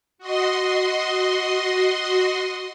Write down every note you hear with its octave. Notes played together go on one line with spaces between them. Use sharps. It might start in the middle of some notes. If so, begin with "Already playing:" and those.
F#4 D#5 C6